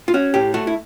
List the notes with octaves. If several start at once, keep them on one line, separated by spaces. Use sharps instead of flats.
F4
C#4 F#4
A2 G4
A3 F#4
E4